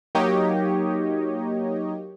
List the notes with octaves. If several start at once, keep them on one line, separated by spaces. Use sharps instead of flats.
F#3 A#3 D#4 G4 C#5 D#5